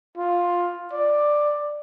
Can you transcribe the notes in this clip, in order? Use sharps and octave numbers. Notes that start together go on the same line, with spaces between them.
F4
D5